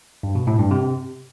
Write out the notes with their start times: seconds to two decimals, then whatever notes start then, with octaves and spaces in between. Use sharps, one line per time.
0.23 G2
0.35 B2
0.47 A2
0.59 G2
0.71 C3